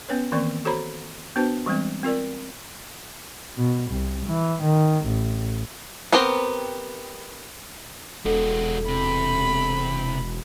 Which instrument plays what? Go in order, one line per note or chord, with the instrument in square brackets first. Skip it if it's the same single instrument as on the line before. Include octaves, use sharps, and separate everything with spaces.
[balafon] B3 C#4 B4 C#5
D#3 E3 A#3 C4 D5 C#6
F#4 A4 C5 C#5 A#5 B5
B3 D4 F#4 B4 C5 A5
E3 G3 G#3 C4
C4 F4 A#4 D5
[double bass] B2
C2
E3
D#3
A1
[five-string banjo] B3 C4 G4 A#4 C5
[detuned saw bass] E1 [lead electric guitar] G#3 F#4 [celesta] A4
[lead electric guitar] C3 [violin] B5